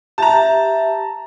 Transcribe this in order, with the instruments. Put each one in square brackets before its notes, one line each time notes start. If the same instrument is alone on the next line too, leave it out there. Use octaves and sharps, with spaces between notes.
[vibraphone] G4 E5 [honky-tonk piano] A5 A#5